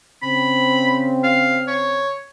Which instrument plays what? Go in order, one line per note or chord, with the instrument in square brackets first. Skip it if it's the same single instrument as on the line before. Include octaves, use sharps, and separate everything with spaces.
[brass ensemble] C#3 C4 [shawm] B5
[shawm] F5
C#5